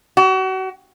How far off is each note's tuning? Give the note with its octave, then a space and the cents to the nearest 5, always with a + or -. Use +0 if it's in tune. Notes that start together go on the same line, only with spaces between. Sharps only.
F#4 +35